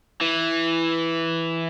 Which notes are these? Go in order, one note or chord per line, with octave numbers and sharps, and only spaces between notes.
E3